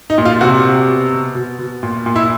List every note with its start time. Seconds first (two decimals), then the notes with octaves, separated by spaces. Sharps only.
0.10 D#4
0.18 A#2
0.25 F4
0.41 C3 F#4
0.65 C3
0.88 B2
1.12 B2
1.35 B2
1.59 B2
1.83 A#2
2.06 A#2
2.16 E4